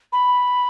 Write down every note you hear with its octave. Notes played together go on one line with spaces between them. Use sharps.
B5